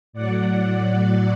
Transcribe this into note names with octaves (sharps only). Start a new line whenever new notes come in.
A2 F#3 D5 F#5